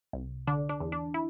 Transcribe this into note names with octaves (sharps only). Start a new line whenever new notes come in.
C2
D3 D4
D4
E2
D4
E4